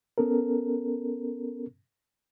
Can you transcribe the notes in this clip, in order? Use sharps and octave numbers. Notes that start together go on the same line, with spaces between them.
B3 C#4 A4 A#4